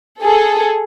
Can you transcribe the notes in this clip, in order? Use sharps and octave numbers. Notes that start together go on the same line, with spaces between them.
G#4 A4